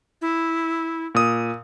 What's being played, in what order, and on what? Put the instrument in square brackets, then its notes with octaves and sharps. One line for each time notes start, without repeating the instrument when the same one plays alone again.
[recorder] E4
[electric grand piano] A#2 D#6